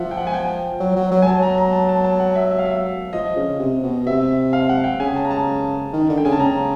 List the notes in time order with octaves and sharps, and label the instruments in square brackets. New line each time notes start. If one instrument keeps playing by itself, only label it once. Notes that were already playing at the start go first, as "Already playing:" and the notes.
Already playing: [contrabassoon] F3 [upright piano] E5 F#5
[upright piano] G5
F#5
G#5
G5
[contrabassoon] F#3
F#3
F#3
[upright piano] G#5
[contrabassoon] F#3 [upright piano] A5
[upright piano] A#5
A#5
A5
A5
A5
F#5
E5
E5
F5
E5
[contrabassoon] F3 [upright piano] D#5
[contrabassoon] C#3
C3
B2
[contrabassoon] C3 [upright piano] E5
[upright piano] F5
F#5
G5
[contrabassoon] C#3 [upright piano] G#5
[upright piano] A5
A#5
A5
[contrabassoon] D#3
D3
[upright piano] G5
[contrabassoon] C#3 [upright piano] G#5
[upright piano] A5
[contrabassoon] C#3 [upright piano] A#5